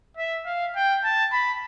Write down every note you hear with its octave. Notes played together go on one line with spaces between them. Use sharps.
E5
F5
G5
A5
B5